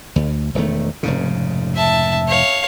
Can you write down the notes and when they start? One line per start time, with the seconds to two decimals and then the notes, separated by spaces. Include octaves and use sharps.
0.16 D2
0.55 E1 D#3 A3
1.03 F1 G#2 C#3
1.75 E5 A5
2.28 C#5 F5